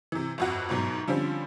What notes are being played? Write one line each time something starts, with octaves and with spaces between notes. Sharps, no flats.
C3 E3
G1 F2 F#4
G1 G#2 B2 F#3
D3 F3 G3 C4 C#4